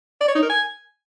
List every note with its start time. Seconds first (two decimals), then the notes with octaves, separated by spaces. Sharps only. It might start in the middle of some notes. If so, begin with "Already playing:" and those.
0.21 D5
0.28 C#5
0.35 D#4
0.42 A#4
0.50 G#5